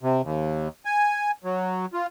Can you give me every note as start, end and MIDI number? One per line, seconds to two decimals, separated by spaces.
0.03 0.22 48
0.24 0.68 39
0.85 1.31 80
1.44 1.86 54
1.93 2.07 65